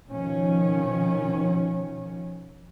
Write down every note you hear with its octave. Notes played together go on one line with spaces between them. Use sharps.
B2 D#3 F3 C#4